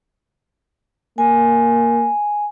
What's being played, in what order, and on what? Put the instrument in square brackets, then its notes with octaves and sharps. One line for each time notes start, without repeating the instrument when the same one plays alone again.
[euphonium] A#3 [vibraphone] G#5